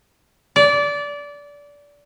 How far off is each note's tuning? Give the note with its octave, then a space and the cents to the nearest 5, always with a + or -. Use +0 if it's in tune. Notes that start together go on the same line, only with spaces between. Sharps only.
D5 -20